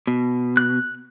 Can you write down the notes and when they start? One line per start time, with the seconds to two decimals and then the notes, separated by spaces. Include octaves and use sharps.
0.07 B2
0.57 F#6